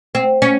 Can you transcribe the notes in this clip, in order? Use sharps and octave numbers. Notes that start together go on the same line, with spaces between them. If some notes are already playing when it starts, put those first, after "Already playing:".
C4
C#4